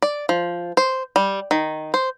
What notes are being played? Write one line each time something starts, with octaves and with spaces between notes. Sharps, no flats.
D5
F3
C5
G3
D#3
C5